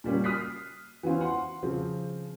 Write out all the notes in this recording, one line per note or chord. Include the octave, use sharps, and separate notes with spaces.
A#2 G3 A#3 C#4
D#6 F6 F#6 B6 C7
E3 B3 C#4 F4 C5
F#5 C6
C#3 F3 C4